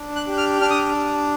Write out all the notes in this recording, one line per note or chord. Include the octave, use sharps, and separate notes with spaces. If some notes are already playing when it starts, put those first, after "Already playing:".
Already playing: D4
F#6
G4
F6
D4 F6
D#6